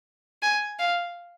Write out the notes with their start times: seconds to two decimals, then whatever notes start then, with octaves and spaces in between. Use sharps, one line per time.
0.43 G#5
0.79 F5